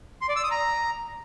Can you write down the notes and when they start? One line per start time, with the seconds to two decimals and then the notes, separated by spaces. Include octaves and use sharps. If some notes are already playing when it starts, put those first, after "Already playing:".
0.21 C6
0.29 D5
0.36 E6
0.43 D#6
0.51 A#5